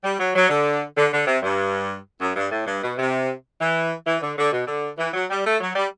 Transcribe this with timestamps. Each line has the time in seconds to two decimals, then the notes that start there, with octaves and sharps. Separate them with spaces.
0.04 G3
0.20 F#3
0.35 F#3
0.50 D3
0.97 D3
1.13 D3
1.27 C3
1.42 G2
2.20 F#2
2.35 G2
2.52 A2
2.66 G2
2.83 B2
2.98 C3
3.60 E3
4.06 E3
4.21 D3
4.37 D3
4.52 B2
4.67 D3
4.99 E3
5.13 F#3
5.30 G3
5.45 A3
5.61 F#3
5.75 G3